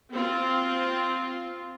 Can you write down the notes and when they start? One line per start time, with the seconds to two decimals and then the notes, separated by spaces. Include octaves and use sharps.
0.13 C4 F4